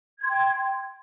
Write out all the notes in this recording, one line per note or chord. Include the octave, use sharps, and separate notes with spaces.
G5 C6 G#6